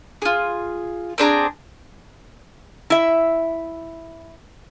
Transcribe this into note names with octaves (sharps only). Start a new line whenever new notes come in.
F4 G#4
C4 D4 G#4 A#5
E4 E5